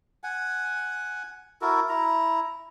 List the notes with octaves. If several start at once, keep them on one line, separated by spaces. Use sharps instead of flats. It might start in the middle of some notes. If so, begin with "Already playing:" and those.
F#5 G#5
E4 F#4 A4 A#4
E4 A#5